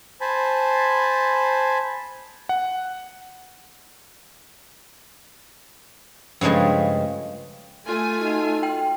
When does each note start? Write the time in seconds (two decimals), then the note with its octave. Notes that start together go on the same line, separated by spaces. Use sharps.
0.21 C5 G#5 A5 B5
2.49 F#5
6.41 G2 C#3 F3 G#3 A3
7.86 A3 F4 G#5
8.20 D#4 F#4 A4
8.63 G5